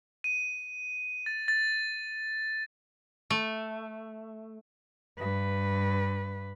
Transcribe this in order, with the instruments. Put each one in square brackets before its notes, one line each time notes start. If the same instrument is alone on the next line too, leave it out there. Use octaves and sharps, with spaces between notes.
[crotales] D#7
A6
A6
[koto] A3
[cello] G2 B4